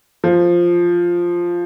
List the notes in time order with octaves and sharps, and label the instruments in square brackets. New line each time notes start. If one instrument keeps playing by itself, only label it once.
[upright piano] F3